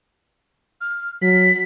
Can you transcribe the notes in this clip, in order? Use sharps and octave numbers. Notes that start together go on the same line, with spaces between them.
F6
F#3 B6